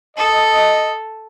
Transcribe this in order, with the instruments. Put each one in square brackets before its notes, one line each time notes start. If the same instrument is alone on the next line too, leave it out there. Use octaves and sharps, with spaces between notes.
[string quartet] A4 [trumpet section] D#5